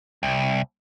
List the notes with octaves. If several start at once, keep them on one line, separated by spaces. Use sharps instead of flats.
C2